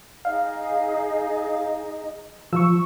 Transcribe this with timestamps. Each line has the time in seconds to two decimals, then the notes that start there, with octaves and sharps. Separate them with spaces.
0.25 D#4 G#4 D#5 F5
2.53 F3 C#6 E6